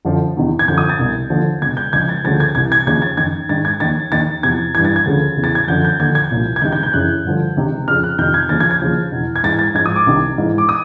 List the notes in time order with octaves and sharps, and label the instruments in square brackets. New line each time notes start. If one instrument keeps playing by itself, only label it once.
[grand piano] F#2 D3 F3
E2 C3 D#3
G#6
F#2 D3 F3 G6
D#6
A6
C2 B2
D#2 D3 F3
C#2 B2 G#6
G6
C#2 C#3 F3 G#6
A6
D2 C#3 F3 A6
G#6
C2 C3 E3 G#6
G#6
D#2 C#3 F3 G#6
A6
F#2 D#3 G#6
G#2 D#3 A6
G#6
D#2 D#3 A6
D#2 D#3 A6
E2 C3 F3 G#6
G2 E3 G#6
A6
G#6
D2 C#3 F3
E2 C#3 E3
A6
G#6
F#2 D3 F3 G6
G6
D#2 D3 F3 G#6
G#6
C2 A#2 F3
G#6
C#2 C3 D#3 G6
G6
G6
F#2 C#3 E3 F#6
G2 D3 F3
C#2 C3 D#3
F2 C#3 F3 F6
F#6
F2 C3 D#3 G6
G#6
D#2 C#3 F3 A6
G#6
G#6
D#2 C#3 F3
E2 B2
G#6
G#2 E3 A6
A6
G#2 G#6
F3
D#6
D6
C2 C3 D#3
G#2 E3
D6
D#6